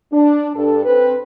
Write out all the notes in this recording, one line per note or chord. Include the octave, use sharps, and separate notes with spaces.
D4
G2 D4 A4
C4 B4